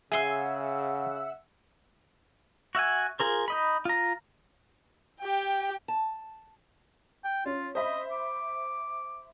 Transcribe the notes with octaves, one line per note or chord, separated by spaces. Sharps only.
C#3 G#4 E5 F#5 G#5 C6 E6
F#4 E5 F#5 G#5
F4 G#4 A#4 C5
D#4 D#5 B5
F4 A#5
G4 G5
A5
G5
C#4 F4
C5 D#5 E5 B5
D6